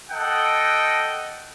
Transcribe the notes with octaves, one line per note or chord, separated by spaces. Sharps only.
A4 D#5 F#5 G5